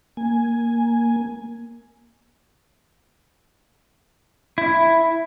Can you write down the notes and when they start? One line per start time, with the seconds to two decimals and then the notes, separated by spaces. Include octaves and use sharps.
0.17 A#3 G#5
4.58 E4